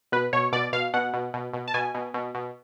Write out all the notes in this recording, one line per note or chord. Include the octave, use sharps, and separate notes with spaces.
B2 B4
B2 C#5
B2 D5
B2 F5
B2 F#5
B2
B2
B2
A5
B2 G#5
B2
B2
B2